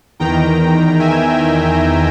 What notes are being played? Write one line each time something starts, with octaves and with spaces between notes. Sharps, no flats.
E2 D#3 G5 A#5
E5 G#5